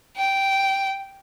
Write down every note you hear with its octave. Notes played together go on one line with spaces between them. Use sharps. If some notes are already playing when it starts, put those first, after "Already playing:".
G5